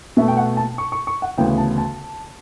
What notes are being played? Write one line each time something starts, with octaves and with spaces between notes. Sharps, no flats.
B2 A3 E5
G5
F#5
A5
C#6
C#6
C#6
F#5
D2 C#3 E3 B3 G5
A5
A5